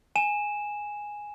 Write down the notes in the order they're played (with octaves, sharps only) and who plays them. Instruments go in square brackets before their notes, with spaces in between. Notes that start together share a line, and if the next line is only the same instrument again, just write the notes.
[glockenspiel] G#5 E7